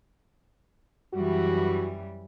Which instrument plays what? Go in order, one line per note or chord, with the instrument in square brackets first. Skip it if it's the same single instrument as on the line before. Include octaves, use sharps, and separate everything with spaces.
[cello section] F#2 E3 G3 [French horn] F#4